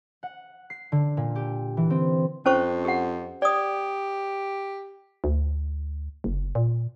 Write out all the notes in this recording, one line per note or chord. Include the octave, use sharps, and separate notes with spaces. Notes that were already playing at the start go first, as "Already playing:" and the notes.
F#5
C7
D3
A#2
G4
E3
C4
F2 C#4 C5 C#6
G4 F#5
G4 D5 D#6
D2
F#1
A#2